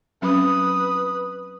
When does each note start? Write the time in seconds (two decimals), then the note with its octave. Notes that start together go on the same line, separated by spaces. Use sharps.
0.22 F#3 C4 C#4 B4 D#6